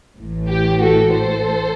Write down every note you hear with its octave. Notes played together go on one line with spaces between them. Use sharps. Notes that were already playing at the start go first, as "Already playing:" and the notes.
A1 A2 E3
G4
F#4 A4
A4 C5